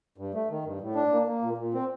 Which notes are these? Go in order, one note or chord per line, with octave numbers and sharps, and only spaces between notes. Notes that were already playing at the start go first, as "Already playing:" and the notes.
G2
A3
D#3
G2
A2
D4
A#3
A#3
A#2
A#2
C4